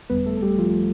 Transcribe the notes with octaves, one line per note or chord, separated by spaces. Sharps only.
G1 F2 D3 G3 B3 B4
A3 A4
A4
G3 G4
F3 F4